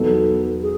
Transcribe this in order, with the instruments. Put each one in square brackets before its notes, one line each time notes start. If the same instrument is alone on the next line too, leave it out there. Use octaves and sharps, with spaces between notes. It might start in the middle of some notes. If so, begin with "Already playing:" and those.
Already playing: [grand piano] E2 B2 F#3 B3 D#4 [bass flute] A4
[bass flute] G#4